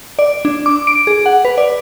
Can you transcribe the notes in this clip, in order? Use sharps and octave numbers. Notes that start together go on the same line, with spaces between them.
D5
D4
D6
D7
G#4
F#5
B4
D5